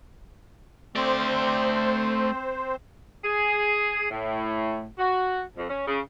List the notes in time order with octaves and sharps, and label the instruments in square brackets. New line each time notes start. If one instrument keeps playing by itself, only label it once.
[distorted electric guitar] A3 D5 [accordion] C4 C5
[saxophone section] G#4
A2
F#4
F2
C#4
C#3